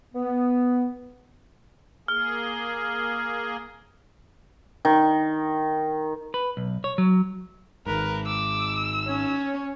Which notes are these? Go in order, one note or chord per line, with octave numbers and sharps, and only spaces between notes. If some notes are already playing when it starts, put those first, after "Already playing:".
B3
A#3 G#4 F6
D#3
B4
B1
C#5
F#3
G#1 G#2 A#4 B4
D6 E6
C#4 C#5